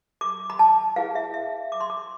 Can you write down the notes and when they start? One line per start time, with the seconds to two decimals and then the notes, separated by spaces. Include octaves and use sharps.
0.21 D6
0.50 B5
0.59 A5
0.96 E4 G#4 B4 F5
1.15 E5
1.34 E5
1.72 D6
1.80 C6
1.90 D6